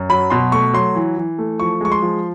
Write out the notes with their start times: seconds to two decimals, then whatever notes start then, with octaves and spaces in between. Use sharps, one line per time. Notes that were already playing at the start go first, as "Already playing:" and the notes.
Already playing: F#2
0.10 F#3 B5
0.30 B2 C6
0.52 A3 C#6
0.73 F#3 C6
0.95 E3
1.17 E3
1.38 A3
1.60 F3 C#6
1.81 G#3 C#6
1.92 C6
2.02 F3